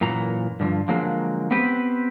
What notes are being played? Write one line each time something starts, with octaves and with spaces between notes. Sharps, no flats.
F#2 A#2 E3 A#5
G2 D3 D#3 F3
D3 F3 F#3 G#3 A#3
B3 C4 G4 B4 C5